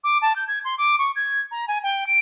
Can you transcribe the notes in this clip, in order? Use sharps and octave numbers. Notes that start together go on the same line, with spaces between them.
D6
A5
G6
G#6
C6
D6
C#6
G#6
A#5
G#5
G5
D7